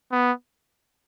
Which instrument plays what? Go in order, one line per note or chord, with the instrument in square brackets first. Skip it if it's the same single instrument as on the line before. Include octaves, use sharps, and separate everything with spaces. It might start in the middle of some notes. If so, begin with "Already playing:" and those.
[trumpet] B3